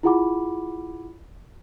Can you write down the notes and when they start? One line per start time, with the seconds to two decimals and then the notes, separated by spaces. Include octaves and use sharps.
0.03 E4 F4 G#4 F#5 B5 D6